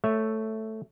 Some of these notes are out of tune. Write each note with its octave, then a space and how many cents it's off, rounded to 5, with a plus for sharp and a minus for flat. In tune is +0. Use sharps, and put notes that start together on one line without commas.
A3 +0 C#5 +0 E5 +0